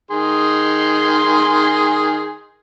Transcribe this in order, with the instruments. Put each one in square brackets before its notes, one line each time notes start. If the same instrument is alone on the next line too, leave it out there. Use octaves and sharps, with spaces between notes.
[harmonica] D#3 G#4 C6